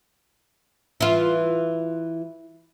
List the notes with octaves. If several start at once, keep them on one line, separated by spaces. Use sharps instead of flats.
E3 F4